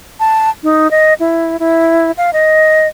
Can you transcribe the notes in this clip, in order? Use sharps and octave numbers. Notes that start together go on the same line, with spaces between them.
A5
D#4
D#5
E4
E4
F5
D#5